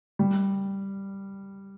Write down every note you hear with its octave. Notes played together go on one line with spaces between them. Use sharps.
G3